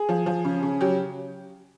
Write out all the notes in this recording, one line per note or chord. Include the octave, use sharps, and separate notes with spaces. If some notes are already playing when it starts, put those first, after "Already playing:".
Already playing: G#4
F3
F3
C#3
C#3
F#3 G4